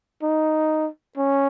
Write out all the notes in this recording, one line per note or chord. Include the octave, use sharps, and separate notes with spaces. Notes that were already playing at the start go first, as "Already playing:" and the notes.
D#4
C#4